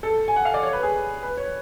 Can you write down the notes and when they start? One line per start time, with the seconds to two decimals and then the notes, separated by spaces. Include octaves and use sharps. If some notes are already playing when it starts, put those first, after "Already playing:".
0.03 A4
0.28 G#5
0.36 F#5
0.45 F5
0.54 D5
0.63 C#5
0.73 B4
0.83 G#4
1.23 B4
1.37 C#5